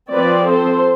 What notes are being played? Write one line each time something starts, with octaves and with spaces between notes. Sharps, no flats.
F3 C4 B4 D5
A4 C5